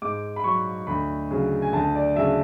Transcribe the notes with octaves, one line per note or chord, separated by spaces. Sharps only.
G#2 D6
B5
F#3 C#6
D2 B5
C#3 F#3
G#5
D2 A5
D5
C#3 F#3 E5